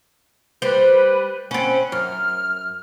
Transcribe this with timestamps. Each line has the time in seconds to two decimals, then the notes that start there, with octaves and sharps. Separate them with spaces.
0.62 G3 B4 C5
1.51 C4 C#4 F#5 B5
1.92 F#2 F6